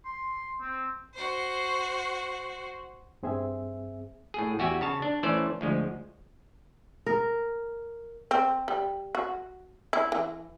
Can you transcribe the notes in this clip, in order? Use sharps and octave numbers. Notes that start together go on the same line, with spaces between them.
C6
C4
F#4 C5
G2 C4 G#4 E5
A2 G#4
E2 F#4 G4 E5 G#5
C#3 C#5 A5
D4
E3 A3 C#4 C5 D5
D2 F3 G#3
A#4
C4
G3
F#4
E4
E3